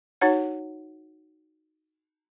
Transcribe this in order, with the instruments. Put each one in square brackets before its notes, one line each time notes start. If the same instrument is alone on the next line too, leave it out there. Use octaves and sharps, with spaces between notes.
[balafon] D#4 F#4 C#5 F#5